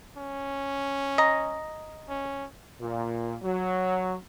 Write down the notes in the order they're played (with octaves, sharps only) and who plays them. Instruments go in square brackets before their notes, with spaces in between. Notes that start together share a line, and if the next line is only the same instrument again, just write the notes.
[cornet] C#4
[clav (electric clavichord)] D#5 A#5
[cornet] C#4
[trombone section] A#2
F#3